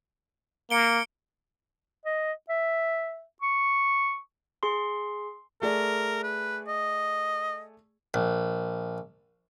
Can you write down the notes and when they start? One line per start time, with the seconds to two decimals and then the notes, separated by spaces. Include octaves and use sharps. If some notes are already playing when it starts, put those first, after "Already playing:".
0.70 A#3 C#7 D7 G7
2.06 D#5
2.49 E5
3.42 C#6
4.63 G#4 C6
5.62 A3 G#4 A#4 D5
6.23 B4
6.67 D#5
8.14 A#1